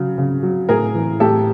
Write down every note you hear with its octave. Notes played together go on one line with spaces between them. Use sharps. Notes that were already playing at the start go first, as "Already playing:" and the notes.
Already playing: C#3 F#3
C#3
F#3
A2 G#4 A#4
E3
A2 G4 A4